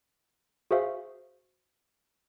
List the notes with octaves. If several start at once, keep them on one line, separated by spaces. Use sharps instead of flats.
F#4 G#4 C5 E5 F5